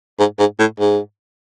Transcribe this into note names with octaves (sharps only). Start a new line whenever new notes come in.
G#2
G#2
A2
G#2